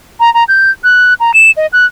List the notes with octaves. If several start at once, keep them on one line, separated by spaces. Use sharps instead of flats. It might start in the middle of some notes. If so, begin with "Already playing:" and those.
A#5
A#5
G6
F#6
A#5
E7
D#5
F#6